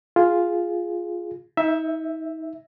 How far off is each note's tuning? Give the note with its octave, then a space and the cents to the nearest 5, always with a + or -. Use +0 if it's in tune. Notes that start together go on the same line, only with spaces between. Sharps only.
F4 +0 G#4 +0
D#4 +35 E5 +0